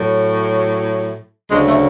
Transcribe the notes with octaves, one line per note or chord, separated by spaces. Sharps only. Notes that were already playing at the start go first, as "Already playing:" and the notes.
Already playing: A2 F#3
D2 C#3 F#3 G#3
A3